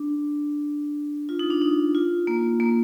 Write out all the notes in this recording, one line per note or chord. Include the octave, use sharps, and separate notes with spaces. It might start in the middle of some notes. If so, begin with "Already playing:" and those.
Already playing: D4
F4
D#4
D4
D#4
F4
A#3
A#3